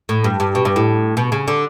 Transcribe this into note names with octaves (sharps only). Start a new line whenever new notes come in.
A2
G2
G2
B2
G2
A2
B2
C#3
D3